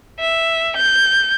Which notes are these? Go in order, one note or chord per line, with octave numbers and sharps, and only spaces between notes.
E5
G6